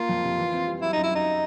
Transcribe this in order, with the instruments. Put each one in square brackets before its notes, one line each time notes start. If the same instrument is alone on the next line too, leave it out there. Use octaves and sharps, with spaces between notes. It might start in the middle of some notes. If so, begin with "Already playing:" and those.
Already playing: [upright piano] A#3 [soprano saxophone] F4
[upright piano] F2
C3
E3
C4
G3
[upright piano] F#3 [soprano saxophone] E4
[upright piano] F#2 [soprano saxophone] D#4
[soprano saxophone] E4
[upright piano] F#3 [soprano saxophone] D#4